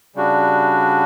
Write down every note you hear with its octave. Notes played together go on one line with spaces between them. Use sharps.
C#3 G3 D4 F#4